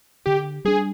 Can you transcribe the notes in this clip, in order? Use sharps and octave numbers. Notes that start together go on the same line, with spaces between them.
D3 G4
G3 D4 G#4